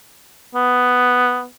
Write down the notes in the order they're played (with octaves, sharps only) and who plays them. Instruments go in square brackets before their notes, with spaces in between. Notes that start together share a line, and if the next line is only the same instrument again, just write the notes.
[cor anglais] B3